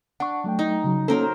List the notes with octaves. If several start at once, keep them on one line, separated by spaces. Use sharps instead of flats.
D4 F#5 C#6
F#3 A3 G5
D#4
C#3 F#3
F#3 A#3 C#4 A4 A#4 C5